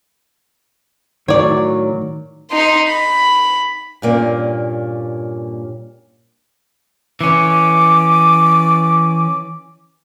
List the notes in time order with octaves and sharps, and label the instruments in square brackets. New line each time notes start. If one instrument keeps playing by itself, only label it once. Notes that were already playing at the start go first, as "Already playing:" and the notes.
[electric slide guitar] A2 D#3 [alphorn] F#3 [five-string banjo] C#5 D5
[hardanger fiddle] D#4 C6
B5
[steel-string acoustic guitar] G2 A#2 A#3 C#4
[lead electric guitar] E3 C#4 [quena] D6